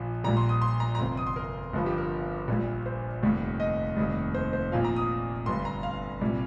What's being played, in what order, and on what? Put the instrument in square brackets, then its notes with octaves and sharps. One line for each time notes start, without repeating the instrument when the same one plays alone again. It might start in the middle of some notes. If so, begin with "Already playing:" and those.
Already playing: [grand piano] A#1 A#2 F3
A#1 A#2 G3 A#5
C6
D#6
C6
A#5
A#5
G1 F2 C3 C6
D#6
C6
A#4
G1 G2 F3
G4
A#4
A#1 A#2 G3
C5
F1 D#2 D#3 G3
D#5
F1 D#2 D#3 G3
C5
C5
A#1 A#2 F3 F5
A#5
D#6
G1 G2 G3 C6
A#5
F5
C2 A#2 G3